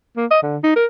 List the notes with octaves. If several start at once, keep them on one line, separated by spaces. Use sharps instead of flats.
A#3
D#5
D3
D#4
A#4